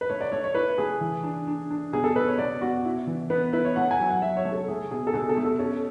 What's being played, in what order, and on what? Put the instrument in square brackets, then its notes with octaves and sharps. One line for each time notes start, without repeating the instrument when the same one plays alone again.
[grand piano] B4
[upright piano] A3 [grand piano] C#5
[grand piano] D5
[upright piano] A3 [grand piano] C#5
[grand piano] C#5
[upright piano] E4 [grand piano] B4
[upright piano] A3 [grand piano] G#4
[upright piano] E3
D4
D4
D4
[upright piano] B2 [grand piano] G#4
[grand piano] A4
[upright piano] B2 [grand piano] B4
[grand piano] C#5
[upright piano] B2 [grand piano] D5
[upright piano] B2 [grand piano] F#4
[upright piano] E4
E3
[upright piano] B3 [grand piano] B4
[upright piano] E4 [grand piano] B4
[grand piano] C#5
[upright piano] A3 [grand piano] F#5
[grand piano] G#5
[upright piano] F#3
[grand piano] F#5
[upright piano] F#3 [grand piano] E5
[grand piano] C#5
[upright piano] A3
[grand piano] A4
[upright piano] A3 [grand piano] G#4
[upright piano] B2 [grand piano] G#4
[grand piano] A4
[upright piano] B2 [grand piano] G#4
[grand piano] A4
[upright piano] A3
[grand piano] A4
[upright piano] C#4 [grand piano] A4